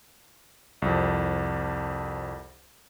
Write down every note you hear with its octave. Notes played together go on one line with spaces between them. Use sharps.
C2 F2